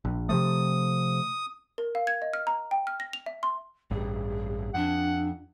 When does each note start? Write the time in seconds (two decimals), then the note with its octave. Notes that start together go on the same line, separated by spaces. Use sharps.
0.05 A#1
0.29 C3 F3 A3 D#6
1.78 A#4
1.95 F5
2.07 G#6
2.22 D#5
2.34 F6
2.47 A#5
2.71 G5
2.87 F6
3.00 A#6
3.13 F7
3.26 E5
3.43 C6
3.91 A1 G2 G#4
4.74 F2 D4 F#5